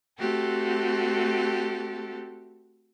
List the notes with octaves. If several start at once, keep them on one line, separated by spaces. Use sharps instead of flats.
A3 C4 F#4 G4 A4